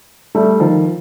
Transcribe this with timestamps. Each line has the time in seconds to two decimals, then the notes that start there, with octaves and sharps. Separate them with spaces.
0.35 G3 A3
0.60 D#3 F3